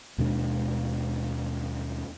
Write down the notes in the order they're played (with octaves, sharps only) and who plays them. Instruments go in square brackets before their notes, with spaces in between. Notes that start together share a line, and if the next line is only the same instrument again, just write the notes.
[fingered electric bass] D#2 B2 G#3 D4